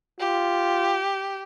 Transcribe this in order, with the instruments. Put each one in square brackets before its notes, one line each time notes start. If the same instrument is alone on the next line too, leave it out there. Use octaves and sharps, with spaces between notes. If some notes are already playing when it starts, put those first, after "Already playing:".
[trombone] F4 [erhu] G4